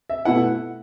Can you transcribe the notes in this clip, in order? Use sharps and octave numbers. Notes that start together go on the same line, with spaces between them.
E5
B2 A3 E4 F#5